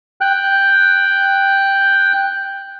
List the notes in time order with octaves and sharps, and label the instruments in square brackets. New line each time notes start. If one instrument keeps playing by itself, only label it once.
[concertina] G5 F#6